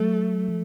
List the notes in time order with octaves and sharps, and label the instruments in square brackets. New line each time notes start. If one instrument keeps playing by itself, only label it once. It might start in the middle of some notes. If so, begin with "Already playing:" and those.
Already playing: [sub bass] F#3 [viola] A3
[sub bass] F3